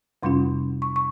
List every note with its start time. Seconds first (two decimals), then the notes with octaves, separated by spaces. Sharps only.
0.23 F2 C3 G3 C#4 F4 C6
0.82 C#6
0.96 C#6